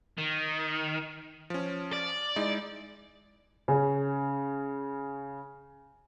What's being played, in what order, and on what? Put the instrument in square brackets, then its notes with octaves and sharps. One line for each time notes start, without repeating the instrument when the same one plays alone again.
[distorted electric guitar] D#3
[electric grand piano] F3 C#4
[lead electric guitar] D5
[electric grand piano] G#3 D#4 E4
[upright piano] C#3 C#4